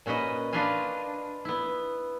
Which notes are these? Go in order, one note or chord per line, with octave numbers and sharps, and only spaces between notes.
A#2 C#4 F#4 B4 D#5
D4 F4 B4 D#5 F5 G#5
B3 E4